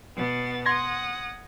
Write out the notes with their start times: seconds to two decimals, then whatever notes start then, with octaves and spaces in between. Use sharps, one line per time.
0.15 B2 B3 A6
0.66 F#5 C6 D#6 G#6 A#6